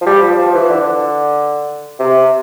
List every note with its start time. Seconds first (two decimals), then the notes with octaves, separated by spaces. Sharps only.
0.01 F3
0.07 G3
0.22 F3
0.38 F3
0.54 E3
0.70 D3
1.99 C3